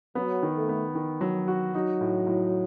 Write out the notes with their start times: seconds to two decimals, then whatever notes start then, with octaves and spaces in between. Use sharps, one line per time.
0.15 F#3 B3
0.43 D#3
0.55 A3
0.69 B3
0.95 D#3
1.21 F#3
1.48 F#4
1.74 F#3 D#4
2.01 A2
2.27 A2